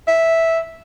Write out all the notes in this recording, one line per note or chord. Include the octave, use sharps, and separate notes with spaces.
E5